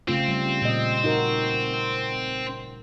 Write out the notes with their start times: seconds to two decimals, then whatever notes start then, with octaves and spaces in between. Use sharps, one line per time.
0.08 C#3 A3 C4 F4
0.28 G3
0.62 A#2 D#5
1.04 D#4 F#4 A#4